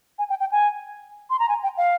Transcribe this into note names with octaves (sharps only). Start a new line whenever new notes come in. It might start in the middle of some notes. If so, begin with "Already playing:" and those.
G#5
G5
G5
G#5
C6
A#5
G#5
G5
F5